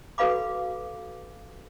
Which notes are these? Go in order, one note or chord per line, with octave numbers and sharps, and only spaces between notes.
F#4 A4 B4 F5 B5 D6